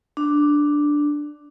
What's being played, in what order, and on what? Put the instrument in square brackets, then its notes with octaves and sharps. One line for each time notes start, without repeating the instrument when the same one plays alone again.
[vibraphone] D4